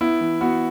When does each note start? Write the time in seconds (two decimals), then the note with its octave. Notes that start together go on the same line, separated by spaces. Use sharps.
0.01 B3 E4
0.21 E3
0.41 B3 F#4